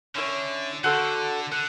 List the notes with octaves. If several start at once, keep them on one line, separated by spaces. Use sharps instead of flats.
D3 C#4 E4 A4 C#5
D3 F#4 A4 C5 F5
D3 F#5